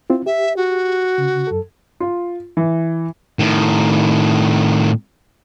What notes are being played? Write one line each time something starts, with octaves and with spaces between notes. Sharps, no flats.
C4 E4 F4
G4 E5
F#4
C#3
F#2 A4
F4
E3
A2 D#3